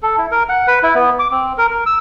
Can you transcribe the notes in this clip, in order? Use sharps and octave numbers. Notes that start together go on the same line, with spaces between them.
A4
E4
A#4
F#5
B4
E4
B3
D6
C4
A#4
A#4
E6